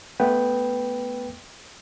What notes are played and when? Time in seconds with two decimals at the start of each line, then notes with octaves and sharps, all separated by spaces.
0.20 A3 B3 B4 G5